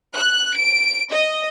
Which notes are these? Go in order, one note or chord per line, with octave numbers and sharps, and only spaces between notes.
F#6
D7
D#5